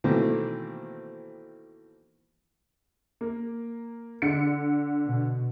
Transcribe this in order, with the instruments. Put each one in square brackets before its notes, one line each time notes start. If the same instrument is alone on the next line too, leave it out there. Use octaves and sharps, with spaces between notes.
[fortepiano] B2 D#3 E3 A3 A#3 C4
[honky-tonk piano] A#3
D3 C#7
[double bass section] B2